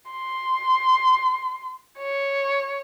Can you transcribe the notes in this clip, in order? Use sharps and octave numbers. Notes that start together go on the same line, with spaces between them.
C6
C#5